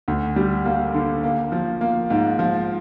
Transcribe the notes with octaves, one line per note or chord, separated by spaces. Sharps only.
D2
G3
A#3
D3
A#3
F3
A#3
G#2
F3